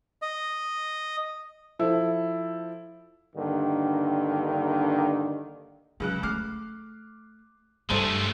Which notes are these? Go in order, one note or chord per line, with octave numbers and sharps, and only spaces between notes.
D#5
F3 E4 A4
G2 D3 D#3 A#3
C#2 C#3 F#3 F#6
A3 D6 F6 C7
G2 G#3 A3 A4 C5 C6